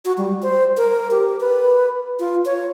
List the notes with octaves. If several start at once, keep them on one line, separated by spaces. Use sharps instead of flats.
F#4
G3
C5
A#4
G4
B4
F4
C#5